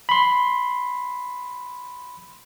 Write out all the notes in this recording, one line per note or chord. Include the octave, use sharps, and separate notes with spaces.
B5 C6